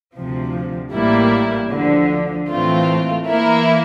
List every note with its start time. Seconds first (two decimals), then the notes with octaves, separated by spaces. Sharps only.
0.14 D2 C3 F3
0.93 A1 A2 G3 A#3 E4
1.70 D2 D3 F3
2.49 A2 E3 A3 C4 F4
3.28 E3 A#3 E4 A#4